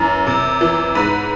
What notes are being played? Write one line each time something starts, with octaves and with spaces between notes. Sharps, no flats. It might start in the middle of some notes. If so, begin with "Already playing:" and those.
Already playing: F#2 E3 A#4
C3
E3
G#2 B4